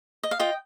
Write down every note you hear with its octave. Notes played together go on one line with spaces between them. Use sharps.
D#5
F5
F4 D#5 G5